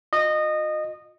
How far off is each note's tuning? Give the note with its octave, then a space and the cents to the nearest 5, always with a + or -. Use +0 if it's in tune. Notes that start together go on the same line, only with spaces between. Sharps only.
F4 +35 D#5 -20